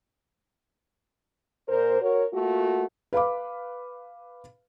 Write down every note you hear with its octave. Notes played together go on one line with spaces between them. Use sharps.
A#2 A#4 C5
F#4 A#4 C#5
A3 A#3 F4 F#4
B4 F5 B5 D6